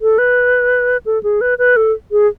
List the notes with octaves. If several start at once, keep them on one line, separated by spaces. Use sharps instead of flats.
A4
B4
A4
G#4
B4
B4
A4
G#4